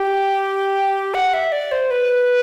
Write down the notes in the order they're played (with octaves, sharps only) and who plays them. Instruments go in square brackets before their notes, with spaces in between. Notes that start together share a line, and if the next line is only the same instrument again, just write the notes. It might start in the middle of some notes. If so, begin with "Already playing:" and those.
Already playing: [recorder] G4
F#5
E5
D5
C5
B4